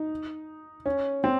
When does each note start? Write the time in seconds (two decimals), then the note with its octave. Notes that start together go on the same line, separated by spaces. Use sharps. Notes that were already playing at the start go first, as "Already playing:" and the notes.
Already playing: D#4
0.86 C#4
1.24 C4